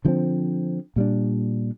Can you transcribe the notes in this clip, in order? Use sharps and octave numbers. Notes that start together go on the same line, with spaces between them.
D3 F3 G#3 C4
A#2 G3 D4